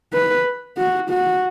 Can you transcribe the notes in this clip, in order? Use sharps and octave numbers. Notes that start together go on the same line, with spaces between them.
B4
F#4
F#4